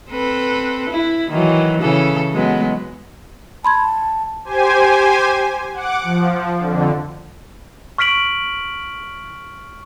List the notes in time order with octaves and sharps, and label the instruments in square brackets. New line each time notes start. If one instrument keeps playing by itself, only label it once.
[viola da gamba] C4 A4 B4
E4
D#3 E3 F#3
C#3 E3 A4
F#3 G#3 B3
[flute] A5 [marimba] B5 C6 G#6
[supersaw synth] G4 C5 G#5
F#5 D6
F3
F2 D3
[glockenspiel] C#6 F6 B6 D7 F#7